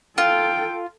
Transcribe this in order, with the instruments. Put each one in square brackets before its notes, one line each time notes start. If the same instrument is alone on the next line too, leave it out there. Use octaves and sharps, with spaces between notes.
[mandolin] F4 [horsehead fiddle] A4 G5